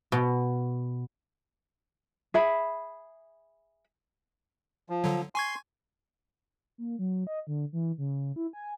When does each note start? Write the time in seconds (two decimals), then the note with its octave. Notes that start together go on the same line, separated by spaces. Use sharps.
0.12 B2
2.34 G#4 E5 B5
4.90 F3
5.04 D3 F#3
5.35 G#5 C6 C#6 G#6
6.78 A#3
6.99 F#3
7.27 D#5
7.47 D3
7.73 E3
7.98 C#3
8.36 E4
8.53 G#5